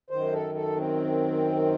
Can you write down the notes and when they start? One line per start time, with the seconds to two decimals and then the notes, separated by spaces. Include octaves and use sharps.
0.10 F#2 D#3 C5
0.32 A4
0.55 A4
0.76 C4